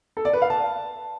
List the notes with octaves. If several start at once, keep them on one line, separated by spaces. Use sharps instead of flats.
A4
D5
B4
F5
A5